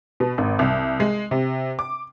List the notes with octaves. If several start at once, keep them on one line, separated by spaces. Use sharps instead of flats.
B2
G#1
C2
G#3
C3
D6